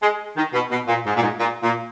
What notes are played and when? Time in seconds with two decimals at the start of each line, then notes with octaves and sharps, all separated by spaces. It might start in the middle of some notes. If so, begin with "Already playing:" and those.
0.01 G#3
0.36 D#3
0.53 B2
0.70 B2
0.87 A#2
1.05 G#2
1.16 A#2
1.21 G#2
1.38 A#2
1.62 A#2